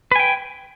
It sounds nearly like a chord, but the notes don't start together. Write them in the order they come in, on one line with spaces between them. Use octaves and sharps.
B4 G#5 G5